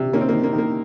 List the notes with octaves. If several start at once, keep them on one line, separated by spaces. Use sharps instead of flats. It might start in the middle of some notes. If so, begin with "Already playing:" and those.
Already playing: C3
D#3 A#3 C#4
C4
A#3
D#3
A#3
D#3
A#3